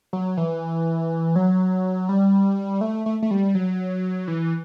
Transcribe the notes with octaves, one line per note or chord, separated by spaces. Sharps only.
F#3
E3
F#3
G3
A3
A3
A3
G3
F#3
E3